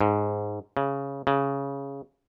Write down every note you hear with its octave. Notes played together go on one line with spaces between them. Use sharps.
G#2
C#3
C#3